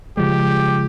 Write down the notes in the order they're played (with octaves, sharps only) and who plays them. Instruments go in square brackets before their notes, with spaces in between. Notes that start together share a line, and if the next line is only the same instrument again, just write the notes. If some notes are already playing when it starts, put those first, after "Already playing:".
[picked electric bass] C#3 F3 G#3 [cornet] G4